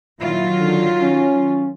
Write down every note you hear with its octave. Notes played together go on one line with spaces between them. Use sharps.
A#2 D#3 F#3 E4 F4
D3
C#4